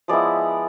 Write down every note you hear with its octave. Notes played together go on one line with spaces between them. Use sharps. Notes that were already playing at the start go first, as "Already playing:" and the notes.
F3 G#3 B3 E4 D5